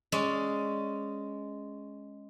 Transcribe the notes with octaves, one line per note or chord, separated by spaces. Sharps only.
G#3 C#4 D5